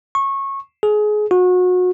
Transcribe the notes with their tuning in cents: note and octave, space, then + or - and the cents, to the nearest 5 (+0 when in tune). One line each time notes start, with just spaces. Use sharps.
C#6 -20
G#4 +25
F#4 -30